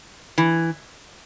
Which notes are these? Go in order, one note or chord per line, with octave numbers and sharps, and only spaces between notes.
E3